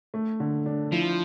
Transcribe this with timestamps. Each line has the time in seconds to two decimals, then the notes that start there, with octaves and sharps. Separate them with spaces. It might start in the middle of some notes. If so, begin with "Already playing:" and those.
0.14 A3
0.40 D3
0.66 D4
0.92 F3 E4